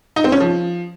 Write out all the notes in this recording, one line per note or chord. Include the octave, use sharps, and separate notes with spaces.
D#4
C4
C#4
F3